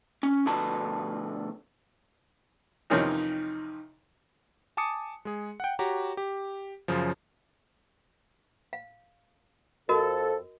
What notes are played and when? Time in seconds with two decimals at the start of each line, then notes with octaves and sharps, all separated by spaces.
0.23 C#4
0.45 D2 B2 D3 F3 B4 A5
2.90 F2 C3 D#3 E3 C#4 D#4
4.77 G#5 A5 D6 D#6 C#7
5.25 G#3 G#4
5.60 F#5 G5
5.79 F#4 G4 C#5 A#5
6.17 G4
6.88 F#2 C#3 F3
8.73 F5
9.89 F2 F#4 A4 A#4 D#5